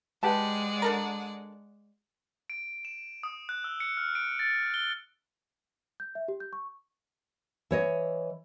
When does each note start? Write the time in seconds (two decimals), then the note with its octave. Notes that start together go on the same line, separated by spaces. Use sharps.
0.23 G#3 G4 B4 D5 F#5 A5
0.82 D4 A4 A#4
2.50 D7
2.85 E7
3.23 D#6
3.49 F#6
3.64 E6
3.80 C#7
3.97 F6
4.15 D7
4.39 A6
4.74 G7
6.00 G6
6.15 E5
6.28 G4
6.40 G6
6.53 C#6
7.71 E3 C#5 D#5